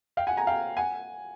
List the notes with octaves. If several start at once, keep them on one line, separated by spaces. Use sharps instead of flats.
F5 G5
F#5 G#5
G#5 A#5
F5 G5
F#5 G#5